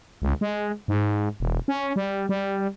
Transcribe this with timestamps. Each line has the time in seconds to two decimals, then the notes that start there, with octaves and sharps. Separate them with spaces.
0.22 C#2
0.41 G#3
0.88 G#2
1.40 E1
1.68 C#4
1.96 G3
2.29 G3